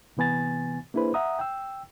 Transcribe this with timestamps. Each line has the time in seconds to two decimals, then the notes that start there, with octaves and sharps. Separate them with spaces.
0.17 C3 E3 B3 G#5 A6
0.94 A#3 D4 E4 G#4 B4 C5
1.14 E5 F#5 A#5 D#6
1.39 G5 E6